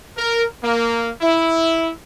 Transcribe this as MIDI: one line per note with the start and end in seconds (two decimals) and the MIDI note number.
0.17 0.45 70
0.63 1.10 58
1.22 1.90 64